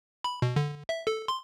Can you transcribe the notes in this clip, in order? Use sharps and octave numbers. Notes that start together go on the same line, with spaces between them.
B5
B2
D3
E5
A4
C6